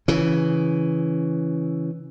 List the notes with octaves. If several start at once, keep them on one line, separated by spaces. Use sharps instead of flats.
C#3 E3